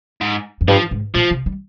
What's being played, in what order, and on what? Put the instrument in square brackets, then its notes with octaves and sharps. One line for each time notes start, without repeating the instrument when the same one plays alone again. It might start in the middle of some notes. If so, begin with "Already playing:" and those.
[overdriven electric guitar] G#2
[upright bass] F2
[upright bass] G2 [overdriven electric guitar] F3
[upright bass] G#2
[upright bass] A#2 [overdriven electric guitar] F3
[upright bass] C3
G3